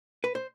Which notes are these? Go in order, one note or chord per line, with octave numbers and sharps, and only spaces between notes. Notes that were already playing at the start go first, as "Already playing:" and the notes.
B4
C5